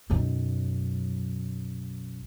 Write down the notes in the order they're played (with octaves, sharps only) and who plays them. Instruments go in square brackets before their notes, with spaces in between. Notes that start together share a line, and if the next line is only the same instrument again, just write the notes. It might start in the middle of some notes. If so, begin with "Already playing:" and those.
[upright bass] B1 F#2